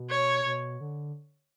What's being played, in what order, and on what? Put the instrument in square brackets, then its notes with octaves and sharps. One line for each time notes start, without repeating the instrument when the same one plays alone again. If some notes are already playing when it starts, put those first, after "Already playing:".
Already playing: [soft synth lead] B2
[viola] C#5
[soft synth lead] B2
D3